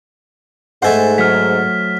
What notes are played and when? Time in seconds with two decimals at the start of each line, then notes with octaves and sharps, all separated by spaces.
0.82 G#2 A3 A4 C5 F#5 G#5
1.18 F#3 F6 B6